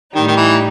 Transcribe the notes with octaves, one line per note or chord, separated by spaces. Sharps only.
A2 D#3 G3 D#4
D#3
E3